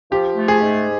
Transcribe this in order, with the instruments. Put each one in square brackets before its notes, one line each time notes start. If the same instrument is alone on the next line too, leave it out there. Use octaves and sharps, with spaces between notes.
[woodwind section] F3 [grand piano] G4
[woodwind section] A3
[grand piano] G#4
[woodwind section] G#2